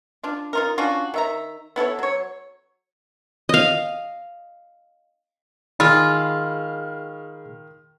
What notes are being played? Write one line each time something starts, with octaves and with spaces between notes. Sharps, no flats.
D4 F4
D#4 F4 A#4
C#4 D4 F4 F#4
D#3 E5 A#5
B3 E4 A4 C#5
F#3 C#5
D#5 F5
D#3 G#3 F4 G#4 B5 E6